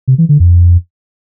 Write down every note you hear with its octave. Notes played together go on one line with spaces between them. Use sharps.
C3
E3
D3
F2